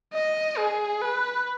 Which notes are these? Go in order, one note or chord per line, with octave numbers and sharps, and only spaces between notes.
D#5
G#4
B4